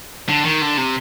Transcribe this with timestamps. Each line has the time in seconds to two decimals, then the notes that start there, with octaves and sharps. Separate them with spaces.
0.29 D3
0.45 D#3
0.61 D3
0.77 C3